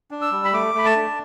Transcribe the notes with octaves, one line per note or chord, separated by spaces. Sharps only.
D4
E6
G3
B5
A3 D6
A3 B5
A5
D4